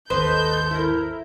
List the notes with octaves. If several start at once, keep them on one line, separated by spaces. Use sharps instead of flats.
G#1 D#2 A4 B4 C5 D#5 G6
E4 A#4